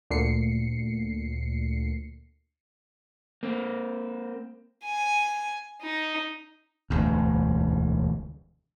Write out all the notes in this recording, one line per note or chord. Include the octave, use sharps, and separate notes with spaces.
D2 A#2 C7 C#7
A#3 C4
G#5
D#4
E1 D2 G2